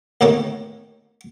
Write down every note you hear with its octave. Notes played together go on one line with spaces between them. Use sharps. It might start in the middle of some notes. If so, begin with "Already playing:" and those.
D#2 A2 D#3 A#3 C#4 D#4